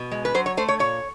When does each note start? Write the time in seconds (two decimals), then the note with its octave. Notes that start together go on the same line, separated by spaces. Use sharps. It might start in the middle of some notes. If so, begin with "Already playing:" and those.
Already playing: B2
0.11 G#3
0.25 B4
0.34 F#3 C5
0.46 C#5
0.57 A3 C5
0.68 C#5
0.79 A#2 C#5